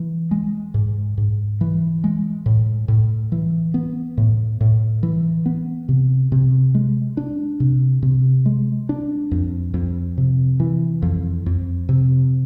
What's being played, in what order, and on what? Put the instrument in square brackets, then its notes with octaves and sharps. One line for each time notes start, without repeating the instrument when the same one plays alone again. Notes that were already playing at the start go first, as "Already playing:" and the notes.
Already playing: [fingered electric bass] E3
G#3
G#2
G#2
E3
G#3
A2
A2
E3
B3
A2
A2
E3
B3
C3
C3
G#3
D4
C3
C3
G#3
D4
F2
F2
C3
E3
F2
F2
C3